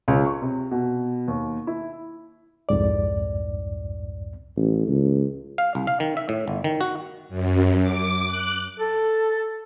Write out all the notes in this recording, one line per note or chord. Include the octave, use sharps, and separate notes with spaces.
C#2
C#6
C3
B2
D#2
E4
C2 F2 G#2 D5
A1
C#2
F5
C2
F5
D#3
E5
A2
G1
D#3
F#4
F#2
D6
F#6
A4